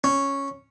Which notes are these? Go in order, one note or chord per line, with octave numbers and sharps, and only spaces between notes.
C#4